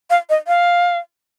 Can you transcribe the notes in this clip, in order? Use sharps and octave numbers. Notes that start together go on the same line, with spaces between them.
F5
D#5
F5